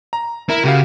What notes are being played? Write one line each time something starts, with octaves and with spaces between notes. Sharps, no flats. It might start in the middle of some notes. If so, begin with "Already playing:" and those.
A#5
E4 A#4
C#3 F#4 G4 F5